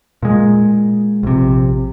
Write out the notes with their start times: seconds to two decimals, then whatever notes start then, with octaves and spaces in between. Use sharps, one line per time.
0.23 A#2 G#3
1.23 A#1 C3